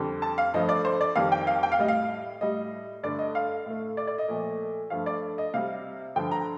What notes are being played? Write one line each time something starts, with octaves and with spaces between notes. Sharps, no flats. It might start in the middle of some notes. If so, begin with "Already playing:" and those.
Already playing: F2 D3 G3
A5
F5
G2 F3 A3 D#5
D5
C5
D5
F2 D#3 G3 F5
G5
F5
G5
F5
A2 G3 D#5
F5
A2 G3 D#5
G2 D3 A3 D5
D#5
F5
A2 A3
D5
D5
D#5
A#2 F3 A3
G2 F3 A3 F5
D5
D#5
C3 G3 F5
G2 D3 F3 G5
A#5